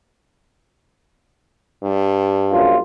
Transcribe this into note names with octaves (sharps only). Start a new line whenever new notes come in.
G2
A#1 F#2 F4